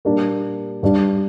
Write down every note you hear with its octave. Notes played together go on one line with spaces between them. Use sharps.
A#2 G3 A#3 D4
G2 G3 D4